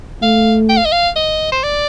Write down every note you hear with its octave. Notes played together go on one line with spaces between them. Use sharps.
A3 F5
G5
F5
D#5
F5
D#5
C5
D5